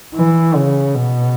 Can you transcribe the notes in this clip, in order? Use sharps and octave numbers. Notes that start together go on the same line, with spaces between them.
E3
C#3
B2